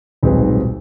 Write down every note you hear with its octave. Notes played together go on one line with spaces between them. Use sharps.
D#1 B1 G#2 C4 G#4 B4